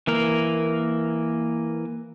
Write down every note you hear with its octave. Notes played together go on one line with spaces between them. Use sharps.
E3 A#3 A#4